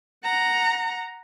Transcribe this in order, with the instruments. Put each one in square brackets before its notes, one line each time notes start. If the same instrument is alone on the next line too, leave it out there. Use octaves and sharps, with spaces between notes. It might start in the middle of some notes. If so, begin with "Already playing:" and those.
[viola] F#5 A#5